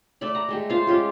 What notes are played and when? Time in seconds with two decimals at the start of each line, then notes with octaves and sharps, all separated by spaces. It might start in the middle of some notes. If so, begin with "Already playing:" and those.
0.21 A3 D5 B5
0.35 A#5
0.49 G#3 A3 G4
0.69 F4 C5 F5
0.87 G#3 C#4 F4 G4